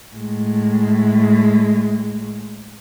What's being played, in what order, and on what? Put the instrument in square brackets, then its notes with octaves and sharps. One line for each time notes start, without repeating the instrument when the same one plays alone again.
[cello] A2 G#3